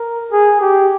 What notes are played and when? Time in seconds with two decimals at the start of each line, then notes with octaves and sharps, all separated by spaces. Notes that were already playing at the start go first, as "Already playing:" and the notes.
Already playing: A#4
0.32 G#4
0.61 G4